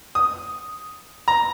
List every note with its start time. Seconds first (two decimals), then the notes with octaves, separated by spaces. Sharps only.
0.15 D#6
1.28 A#5